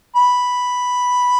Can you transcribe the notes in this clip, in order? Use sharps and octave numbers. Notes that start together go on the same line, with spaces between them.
B5